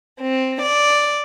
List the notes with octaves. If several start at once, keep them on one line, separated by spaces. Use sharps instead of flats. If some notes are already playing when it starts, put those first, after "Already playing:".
C4
D5